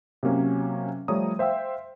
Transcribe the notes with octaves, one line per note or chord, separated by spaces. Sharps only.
C3 F#3 A#3 C#4
F3 G3 A3 C#5 A#5 D#6
C5 E5 F5 G5 E6